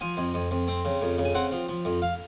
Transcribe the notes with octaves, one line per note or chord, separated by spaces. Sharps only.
F3 G#5
F2
F2
F2
C4
C#3
F2
C#3
G#5
C4 F#5
F3
F3
F2
F5